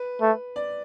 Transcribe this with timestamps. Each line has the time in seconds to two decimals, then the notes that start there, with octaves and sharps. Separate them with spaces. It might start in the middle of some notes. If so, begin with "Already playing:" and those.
Already playing: B4
0.21 A3
0.56 D5